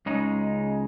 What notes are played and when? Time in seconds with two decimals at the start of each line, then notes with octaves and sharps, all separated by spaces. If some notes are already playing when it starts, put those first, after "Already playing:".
0.06 C#2 C#3 G#3 D#4